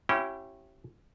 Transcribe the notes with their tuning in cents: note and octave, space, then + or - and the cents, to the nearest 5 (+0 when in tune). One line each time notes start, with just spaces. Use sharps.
C#4 -25 E4 +20 G4 -30